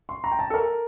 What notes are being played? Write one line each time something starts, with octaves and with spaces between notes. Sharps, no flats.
C6
A#5
G5
A5
A4
A#4